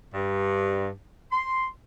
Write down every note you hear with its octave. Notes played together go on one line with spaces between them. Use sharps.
G2
C6